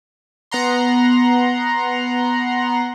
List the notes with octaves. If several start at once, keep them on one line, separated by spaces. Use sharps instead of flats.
B3 F#5 A#5 C6